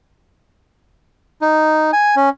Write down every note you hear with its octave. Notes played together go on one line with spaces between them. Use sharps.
D#4
G#5
C#4